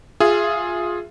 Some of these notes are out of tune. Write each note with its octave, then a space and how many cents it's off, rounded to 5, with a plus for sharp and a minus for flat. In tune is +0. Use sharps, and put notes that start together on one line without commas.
F4 +10 G#4 +0 E5 +35